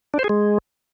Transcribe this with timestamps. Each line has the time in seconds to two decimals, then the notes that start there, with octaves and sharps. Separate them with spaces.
0.14 D4
0.19 C5
0.24 G#4
0.29 G#3